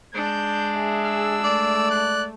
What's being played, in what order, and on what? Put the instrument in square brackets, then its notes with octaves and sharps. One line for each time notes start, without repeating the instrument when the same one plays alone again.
[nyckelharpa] G#3 D4 [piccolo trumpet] G6
[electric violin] G#4 E5
[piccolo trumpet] E6
[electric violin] A3 [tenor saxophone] D5
[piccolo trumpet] F#6